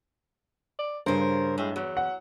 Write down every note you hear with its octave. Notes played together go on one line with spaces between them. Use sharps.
D5
G2 C#3 A#4 C5
C5
A2 G#3
E2 F#3
F#5